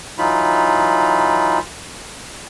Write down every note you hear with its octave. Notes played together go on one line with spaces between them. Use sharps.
E3 F#3 D#4 F4 B5